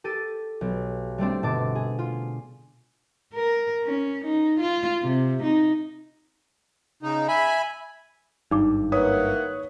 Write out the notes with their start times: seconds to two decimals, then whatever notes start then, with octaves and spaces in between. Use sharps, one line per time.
0.04 G4 A4 A6 D#7
0.61 B1
1.18 G3 A3 C4 D4
1.43 G1 B2 D4 A5 D6
1.75 G#4
1.99 F4
3.34 A#4
3.84 C#4
4.24 D#4
4.60 F4
5.02 C3
5.42 D#4
7.03 C#3 D#4
7.28 E5 G#5 B5
8.51 G#1 G2 D#4 D6
8.92 A#3 E4 B4 C#5 F#5 D#6